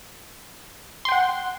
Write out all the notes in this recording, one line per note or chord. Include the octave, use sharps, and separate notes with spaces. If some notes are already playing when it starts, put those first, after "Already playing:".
F#5 G5 C6